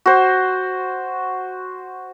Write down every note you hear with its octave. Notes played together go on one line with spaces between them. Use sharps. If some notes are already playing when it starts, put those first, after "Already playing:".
F#4 C5